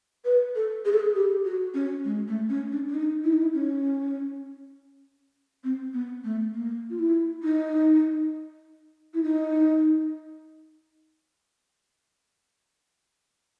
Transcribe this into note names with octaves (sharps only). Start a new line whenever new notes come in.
B4
A4
G#4
A4
G#4
G4
F#4
C#4
G#3
A3
C#4
D4
D4
D#4
E4
D#4
E4
C#4
C4
B3
A3
A#3
F4
E4
D#4
E4
D#4